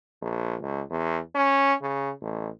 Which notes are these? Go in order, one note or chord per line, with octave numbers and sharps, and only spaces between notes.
A#1
C#2
E2
C#4
C#3
A1